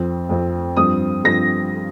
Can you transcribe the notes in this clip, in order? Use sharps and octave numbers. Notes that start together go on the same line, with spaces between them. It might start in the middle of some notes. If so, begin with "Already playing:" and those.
Already playing: F2 F3 C4
F2 F3 C4
G2 F3 C4 D#6
G2 F3 C4 A#6